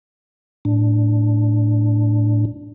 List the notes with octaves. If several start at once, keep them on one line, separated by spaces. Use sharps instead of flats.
A2 D4